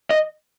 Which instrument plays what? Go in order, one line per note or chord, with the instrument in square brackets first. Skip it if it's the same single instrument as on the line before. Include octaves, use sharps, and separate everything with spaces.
[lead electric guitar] D#5